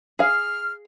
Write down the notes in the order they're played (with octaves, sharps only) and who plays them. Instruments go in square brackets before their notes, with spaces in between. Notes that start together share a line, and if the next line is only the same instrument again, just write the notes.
[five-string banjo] G#4 F5 [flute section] F6